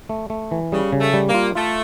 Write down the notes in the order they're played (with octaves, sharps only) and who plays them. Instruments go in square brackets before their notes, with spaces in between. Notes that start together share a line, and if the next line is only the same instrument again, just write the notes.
[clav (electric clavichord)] A3
A3
E3
[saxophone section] C#3 [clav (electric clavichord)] G3
[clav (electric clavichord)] C#3
[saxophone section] A3
[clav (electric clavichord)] G3
[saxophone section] A#3
[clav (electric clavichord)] F4
[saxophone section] A3 [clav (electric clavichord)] F4